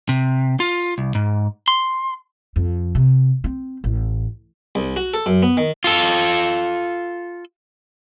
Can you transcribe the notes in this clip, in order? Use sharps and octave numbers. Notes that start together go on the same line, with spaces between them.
C3
F4
C2
G#2
C6
F2
C3
C4
A1
C2
F#4
A4
F#2
B3
D#3
F4 A4